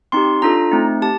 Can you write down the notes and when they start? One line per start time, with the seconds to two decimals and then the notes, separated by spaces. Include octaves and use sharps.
0.12 C4 D#4 G4 C6
0.42 D4 F4 A4 A#5
0.71 A3 C4 D#4
1.02 G4 A5